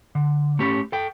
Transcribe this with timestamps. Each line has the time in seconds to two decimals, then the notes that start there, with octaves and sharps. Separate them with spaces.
0.15 D3
0.59 A3 C#4 G4
0.92 A4 G5